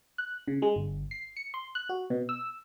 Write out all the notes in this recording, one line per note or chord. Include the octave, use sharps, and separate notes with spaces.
F#6
C#3
G#3
G1
C7
C#7
C6
F#6
F#4
B2
E6